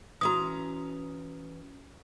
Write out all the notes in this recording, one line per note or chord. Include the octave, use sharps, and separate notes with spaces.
E3 C#4 F#4 A#5 D#6